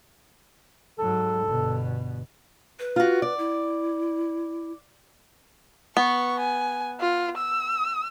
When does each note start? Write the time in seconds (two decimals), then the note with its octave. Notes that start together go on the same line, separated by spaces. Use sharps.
0.99 G#2 F#3 A4
1.44 G1 B2
2.79 B4
2.96 F4 F#4
3.22 D5
3.38 E4
5.97 B3 C#6
6.40 G#5
7.00 F4
7.37 E6